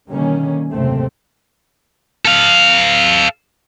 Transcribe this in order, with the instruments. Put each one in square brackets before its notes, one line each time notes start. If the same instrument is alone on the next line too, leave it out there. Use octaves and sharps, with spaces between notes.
[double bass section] B2 D3 D#3 G3 A#3 C#4
F#1 D#2 G#2 C3 A3 C4
[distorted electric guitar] A4 F5